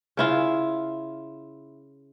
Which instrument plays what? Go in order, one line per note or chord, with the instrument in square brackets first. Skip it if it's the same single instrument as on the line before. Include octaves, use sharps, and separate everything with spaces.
[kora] C#3 E4 F4